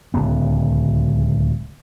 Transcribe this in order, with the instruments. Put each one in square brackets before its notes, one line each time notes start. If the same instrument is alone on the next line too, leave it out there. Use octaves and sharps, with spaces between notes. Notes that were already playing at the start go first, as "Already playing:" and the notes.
[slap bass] D1 C#2 B3